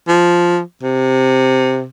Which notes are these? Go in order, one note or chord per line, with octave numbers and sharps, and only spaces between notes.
F3
C3